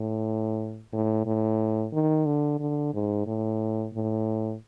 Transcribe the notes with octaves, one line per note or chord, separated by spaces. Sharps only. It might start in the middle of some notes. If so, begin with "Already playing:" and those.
Already playing: A2
A2
A2
D#3
D3
D3
G#2
A2
A2